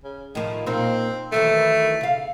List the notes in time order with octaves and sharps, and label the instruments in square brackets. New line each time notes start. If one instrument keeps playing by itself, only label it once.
[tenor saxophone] C#3
[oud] A2 F3 [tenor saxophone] D#3
[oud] A#2 A#3 D#4 [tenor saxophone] C4
[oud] F#2 D#3 E3 [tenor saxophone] A3
[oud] C#3 F5